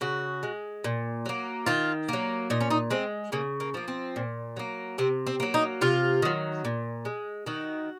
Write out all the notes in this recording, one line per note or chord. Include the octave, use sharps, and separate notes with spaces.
C#3 F#4
G#3
A#2
F#3 A#3
D#3 F4
F#3 A#3
A#2 D#4
C#4
D#4
G#3 C4
C#3 A#3
A#3
F3 A#3
C4
A#2
F#3 A#3
C3 C4
C4
F#3 A#3
D#4
C3 F4
D#3 F#3
A#2
G#3
D#3 F#4